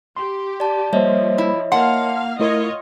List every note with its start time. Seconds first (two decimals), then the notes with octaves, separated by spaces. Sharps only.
0.17 G4 C6
0.60 D5 A5
0.93 F3 G3 A#3 C5 C#5 D#5 E5
1.38 E4
1.72 A#3 F5 F#5 A5 C6
2.40 A3 E4 F4 A#4 C#5 D#5